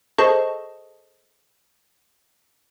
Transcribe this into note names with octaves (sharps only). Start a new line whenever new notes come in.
G#4 A4 C5 D#5 A5 C#6